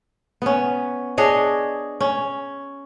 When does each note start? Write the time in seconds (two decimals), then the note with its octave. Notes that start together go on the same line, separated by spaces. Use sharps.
0.42 B3 C#4
1.18 D4 G#4 C#5 D#5
2.00 C#4